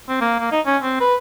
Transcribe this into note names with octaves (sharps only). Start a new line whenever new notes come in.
C4
A#3
A#3
D#4
C#4
C4
B4